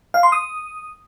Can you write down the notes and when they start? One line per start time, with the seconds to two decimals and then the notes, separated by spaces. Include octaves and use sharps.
0.14 F5
0.23 C6
0.32 D#6